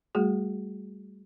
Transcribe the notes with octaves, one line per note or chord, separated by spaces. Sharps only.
G3 A3 F#4 G#4